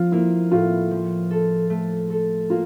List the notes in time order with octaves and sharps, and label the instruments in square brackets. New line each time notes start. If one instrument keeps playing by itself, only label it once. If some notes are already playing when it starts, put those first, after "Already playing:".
Already playing: [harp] F3 [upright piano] F4
[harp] A#3 [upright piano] E4
[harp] A2 [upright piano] F4
[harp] F3
A4
A3
A4
[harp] A#3 [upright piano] F4